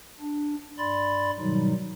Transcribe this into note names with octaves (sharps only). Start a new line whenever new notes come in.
D4
G2 D5 B5 C6 A6
G#2 B2 D#3 F#3 G3 D#4